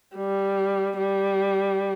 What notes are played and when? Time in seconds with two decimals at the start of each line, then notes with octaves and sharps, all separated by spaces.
0.16 G3
0.98 G3